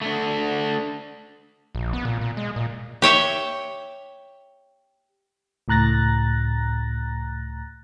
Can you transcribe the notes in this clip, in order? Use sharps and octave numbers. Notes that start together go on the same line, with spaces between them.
A3 D4
A#1
B3
A#2
A#2
G#3
A#2
G4 C#5 E5 G5
C#2 A2 A#5 F#6 A6 A#6